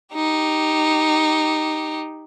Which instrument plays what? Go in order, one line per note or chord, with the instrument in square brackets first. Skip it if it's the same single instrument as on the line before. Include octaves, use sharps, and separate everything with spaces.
[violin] D#4 G4